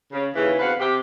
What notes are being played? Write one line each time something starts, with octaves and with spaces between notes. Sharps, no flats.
C#3
D#2 C#3 E3
E2 D3 C4 F#4 B4 F5
C3 G4